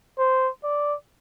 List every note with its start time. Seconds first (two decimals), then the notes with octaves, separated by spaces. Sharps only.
0.19 C5
0.64 D5